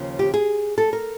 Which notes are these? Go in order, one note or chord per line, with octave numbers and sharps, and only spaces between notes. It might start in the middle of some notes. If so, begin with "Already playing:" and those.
Already playing: D#2 C#3 F3
G4
G#4
A4
A#4